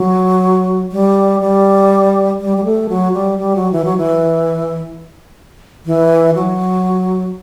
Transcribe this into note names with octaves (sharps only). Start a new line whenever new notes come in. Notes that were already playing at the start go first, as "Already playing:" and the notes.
Already playing: F#3
G3
G3
G3
G3
A3
F#3
G3
G3
F#3
E3
F#3
E3
E3
F#3